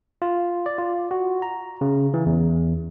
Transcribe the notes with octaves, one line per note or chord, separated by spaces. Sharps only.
F4
D5
F4
F#4
A#5
C#3
E3
E2